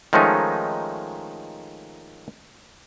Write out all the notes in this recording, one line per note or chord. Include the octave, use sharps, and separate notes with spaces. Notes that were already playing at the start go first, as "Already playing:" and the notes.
D#3 F3 G#3 A3 C#4 D#4